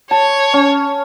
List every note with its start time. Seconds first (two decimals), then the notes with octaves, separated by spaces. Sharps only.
0.11 C#5 A5
0.53 C#4